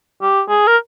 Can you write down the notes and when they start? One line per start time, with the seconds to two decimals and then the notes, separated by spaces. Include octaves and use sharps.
0.22 G4
0.49 G#4
0.67 A#4